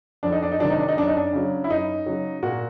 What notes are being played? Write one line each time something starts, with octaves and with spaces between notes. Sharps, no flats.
F2 D4
D#4
D4
D#4
C3 D#3 F#3 D4
D#4
D4
D#4
F#2 D4
D#4
D4
C#3 F#3
E4
F#2 D#4
C#3 F#3
A#2 F#4